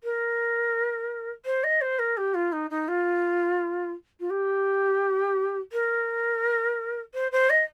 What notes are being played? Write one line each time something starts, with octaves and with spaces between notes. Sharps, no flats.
A#4
C5
D#5
C5
A#4
G4
F4
D#4
D#4
F4
F4
G4
A#4
C5
C5
D#5